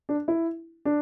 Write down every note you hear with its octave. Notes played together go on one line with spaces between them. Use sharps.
D4
E4
D4